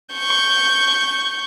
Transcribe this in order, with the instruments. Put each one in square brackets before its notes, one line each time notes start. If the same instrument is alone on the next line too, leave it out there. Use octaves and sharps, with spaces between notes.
[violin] C#6 G6